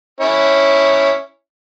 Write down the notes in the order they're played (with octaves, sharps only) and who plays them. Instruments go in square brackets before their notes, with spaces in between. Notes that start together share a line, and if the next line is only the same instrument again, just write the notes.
[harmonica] C#4 E4 C#5